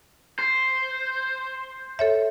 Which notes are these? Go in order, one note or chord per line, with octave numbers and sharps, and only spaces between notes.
C5
A4 C#5 E5